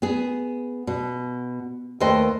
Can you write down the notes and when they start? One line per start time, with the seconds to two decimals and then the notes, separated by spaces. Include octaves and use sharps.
0.02 B3 G#4
0.87 B2
2.00 D#2 A3 B4 C5 D#5 G5